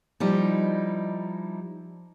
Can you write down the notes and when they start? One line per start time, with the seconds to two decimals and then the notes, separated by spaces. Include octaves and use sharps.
0.20 F3 G3 D#4 E4